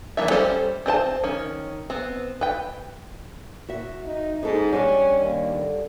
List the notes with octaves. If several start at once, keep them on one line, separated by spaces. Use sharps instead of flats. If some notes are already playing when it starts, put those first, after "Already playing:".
E3 A#3 C#4 F4 E5
G3 C#4 A4 C5
C4 D4 C5 A5
D#3 C#4
B3 C4
B4 G5
F#4 E5
D#4
G#2 D#4 A4
G3 C#4 D4
D#2
D3